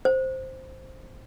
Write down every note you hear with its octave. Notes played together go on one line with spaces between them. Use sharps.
C5